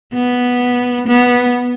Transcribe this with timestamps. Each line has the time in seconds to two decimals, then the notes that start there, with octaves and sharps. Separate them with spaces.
0.14 B3
1.07 B3